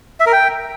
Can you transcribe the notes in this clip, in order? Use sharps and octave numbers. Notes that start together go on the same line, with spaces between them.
E5
A#4
G5